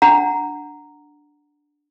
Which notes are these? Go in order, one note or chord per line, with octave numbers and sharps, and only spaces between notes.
D4 F#5 A#5